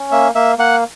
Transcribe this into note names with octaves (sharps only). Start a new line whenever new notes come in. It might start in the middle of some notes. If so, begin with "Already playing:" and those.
Already playing: C#4
A#3 E5
A#3 E5
A#3 F#5